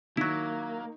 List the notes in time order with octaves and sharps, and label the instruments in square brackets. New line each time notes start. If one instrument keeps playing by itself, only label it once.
[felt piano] D#3 [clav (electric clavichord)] F#3 E4 [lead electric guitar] A#3